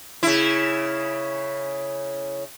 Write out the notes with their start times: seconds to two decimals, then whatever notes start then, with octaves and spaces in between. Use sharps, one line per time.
0.23 C#3 E4